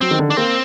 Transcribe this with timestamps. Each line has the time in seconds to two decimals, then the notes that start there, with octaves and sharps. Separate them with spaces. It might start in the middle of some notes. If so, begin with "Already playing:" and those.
0.01 F#3 C4
0.11 D#3
0.19 D3
0.29 D#3 D4
0.37 A#3 C4